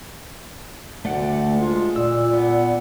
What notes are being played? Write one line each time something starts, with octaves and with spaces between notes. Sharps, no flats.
D2 A3 D5 F#5
G#3 F4
A#2 D5 E6
B3